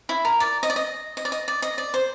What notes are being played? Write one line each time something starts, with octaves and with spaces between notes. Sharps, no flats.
E4
A#4
D5
D#5
D5
D#5
D#5
D5
D#5
D5
D#5
D5
C5